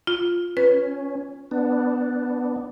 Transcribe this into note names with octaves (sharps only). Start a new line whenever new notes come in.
F4
C#4 B4
B3 D4